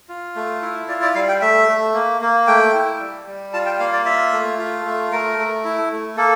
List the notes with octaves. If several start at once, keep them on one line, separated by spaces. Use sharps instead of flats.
F4
A3
E4
F4 D5
D5
G3 F5
G5
A3 E5
A3
A#3
A#3
A3 G5
E4
G3
G3
F4 A5
G5
A#3 F5
D5
F4 E5
A3
F4
A3
A3 A#4
A3
E4
A3
A#3 A4